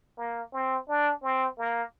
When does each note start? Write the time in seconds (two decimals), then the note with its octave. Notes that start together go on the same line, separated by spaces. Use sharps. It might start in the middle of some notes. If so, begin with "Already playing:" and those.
0.18 A#3
0.53 C4
0.88 D4
1.23 C4
1.58 A#3